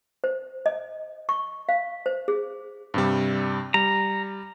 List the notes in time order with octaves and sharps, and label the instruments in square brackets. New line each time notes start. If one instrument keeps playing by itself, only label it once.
[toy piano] C5
D#5
C#6
F5
C5
G#4
[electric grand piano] G2 C3 G3
[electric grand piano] G3 [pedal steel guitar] A#5